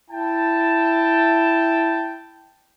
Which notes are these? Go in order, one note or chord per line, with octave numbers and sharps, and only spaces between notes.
E4 G5 A5